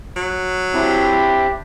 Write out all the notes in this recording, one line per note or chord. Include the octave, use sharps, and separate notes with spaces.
F#3
C4 D4 E4 G4